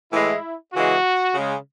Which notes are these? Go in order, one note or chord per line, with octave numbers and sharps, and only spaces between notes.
A2 E3 G#3 E4
C#3 E3 G#3 F#4
C#3 G#3